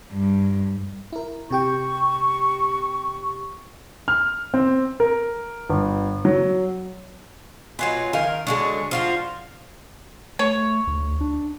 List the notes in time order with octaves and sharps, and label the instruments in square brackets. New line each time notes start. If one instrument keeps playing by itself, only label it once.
[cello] G2
[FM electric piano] E4 A#4
[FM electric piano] C3 G4 G5 [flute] C#6
[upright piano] F6
C4
A#4
G1
F#3
[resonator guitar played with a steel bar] B2 G#3 [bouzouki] F#3 F4 B4 [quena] G#5
[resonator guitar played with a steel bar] D#3 F5 [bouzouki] A#4
[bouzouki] D3 F#3 G#3 [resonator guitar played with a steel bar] D4 G#4 [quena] C#6
[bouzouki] F3 F4 F#4 [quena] F5
[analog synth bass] A3 [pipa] C#5
[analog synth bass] D2
D4